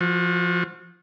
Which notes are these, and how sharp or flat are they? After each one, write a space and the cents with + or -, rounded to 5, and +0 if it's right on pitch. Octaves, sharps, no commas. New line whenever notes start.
F3 -5 F#4 -30